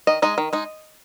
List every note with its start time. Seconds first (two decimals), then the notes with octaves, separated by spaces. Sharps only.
0.07 D#3 D#5
0.22 G#3 D#4 D#5
0.38 D#3
0.53 G#3 D#4